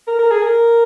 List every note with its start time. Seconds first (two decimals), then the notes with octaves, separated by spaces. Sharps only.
0.08 A#4
0.19 A#4
0.31 G#4
0.42 A#4